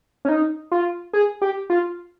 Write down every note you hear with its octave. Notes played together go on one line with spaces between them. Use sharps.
C#4
D#4
F4
G#4
G4
F4